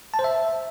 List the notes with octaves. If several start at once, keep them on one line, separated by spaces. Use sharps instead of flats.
A5
C5
E5